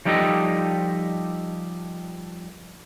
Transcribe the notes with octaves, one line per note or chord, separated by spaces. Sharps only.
F3 G3 D#4 G4 A4 D#5